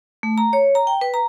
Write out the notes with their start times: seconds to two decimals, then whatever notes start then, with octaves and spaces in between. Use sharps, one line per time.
0.23 A3
0.38 A#5
0.53 C#5
0.75 A#5
0.87 G5
1.01 B4
1.14 A#5